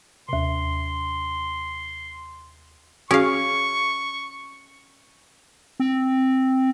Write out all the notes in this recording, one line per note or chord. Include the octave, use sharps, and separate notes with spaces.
D#2 C3 C6
C#4 F#4 G#4 F5 C#6
C4